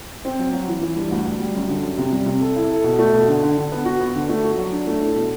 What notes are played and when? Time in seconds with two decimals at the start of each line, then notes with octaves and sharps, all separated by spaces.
0.25 C4
0.39 F#3
0.53 F#3
0.68 E3
0.81 E3
0.96 G2
1.11 D2
1.26 D2
1.40 G3
1.55 F#2
1.69 D3
1.83 F#2
1.98 C3
2.12 G3
2.26 C3
2.40 A4
2.56 E4
2.70 A4
2.84 B2
2.99 A3
3.14 B2
3.28 D3
3.43 D3
3.57 D3
3.72 B3
3.85 F#4
4.00 B3
4.15 D3
4.29 A3
4.43 F#4
4.58 F#3
4.72 D4
4.87 A3
5.02 E4
5.16 B2